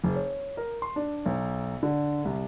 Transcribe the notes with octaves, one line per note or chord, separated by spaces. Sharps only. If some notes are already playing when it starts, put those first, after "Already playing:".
F#1
C#5
A#4
C6
D4
B1
D3
C2